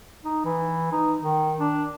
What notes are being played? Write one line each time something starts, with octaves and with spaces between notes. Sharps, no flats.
D#4
E3
D#4
D#3
D4